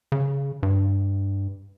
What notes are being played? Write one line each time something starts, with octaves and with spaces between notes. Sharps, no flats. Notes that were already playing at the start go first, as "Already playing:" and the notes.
C#3
G2